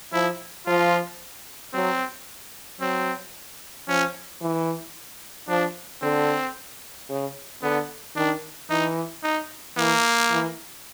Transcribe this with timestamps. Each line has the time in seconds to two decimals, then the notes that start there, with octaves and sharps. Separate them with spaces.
0.13 F3 E4
0.66 F3 F4
1.74 F#3 C4
2.81 F#3 C4
3.88 F3 C#4
4.41 E3
5.48 F3 D4
6.02 D3 C4
7.09 C#3
7.63 D3 B3
8.16 D#3 D4
8.70 E3 D#4
9.23 D#4
9.77 E3 A#3
10.31 E3